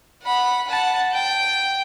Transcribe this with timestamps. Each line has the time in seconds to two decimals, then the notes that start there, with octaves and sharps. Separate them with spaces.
0.22 F#5 B5
0.67 F#5 A5
1.13 G5